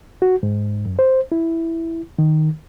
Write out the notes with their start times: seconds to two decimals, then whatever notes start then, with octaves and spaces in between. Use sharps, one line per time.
0.22 F#4
0.43 G#2
0.86 F#2
0.99 C5
1.32 E4
2.19 D#3